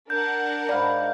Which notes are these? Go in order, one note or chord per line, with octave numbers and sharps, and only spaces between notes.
D4 A#4 F#5 G6
G#2 D5 F5 B5